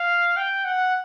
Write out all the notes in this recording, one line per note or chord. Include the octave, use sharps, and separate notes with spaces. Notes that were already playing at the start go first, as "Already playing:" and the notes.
Already playing: F5
G5
F#5